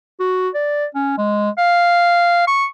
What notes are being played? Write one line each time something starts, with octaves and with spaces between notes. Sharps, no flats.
F#4
D5
C#4
G#3
F5
C#6